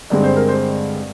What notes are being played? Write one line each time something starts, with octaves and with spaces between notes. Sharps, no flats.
G2 D3 G#3 C4 D5
C5
A#4
C5